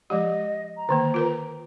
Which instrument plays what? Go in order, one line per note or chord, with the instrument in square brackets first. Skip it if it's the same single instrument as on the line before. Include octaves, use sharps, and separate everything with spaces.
[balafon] F3 G#3 G4 [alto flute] D#5
[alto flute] A#5
[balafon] D3 D#3 A#3
F4 A#4 B4